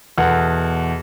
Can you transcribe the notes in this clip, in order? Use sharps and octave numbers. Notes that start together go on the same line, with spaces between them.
E2 B2 A4 F#5